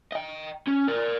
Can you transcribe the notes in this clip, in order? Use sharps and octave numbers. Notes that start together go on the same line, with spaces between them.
D#5 G5
C#4
A#4 D5